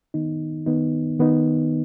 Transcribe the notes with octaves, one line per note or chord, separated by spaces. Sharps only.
D#3 B3 D#4
D#3 B3 D#4
D#3 B3 D#4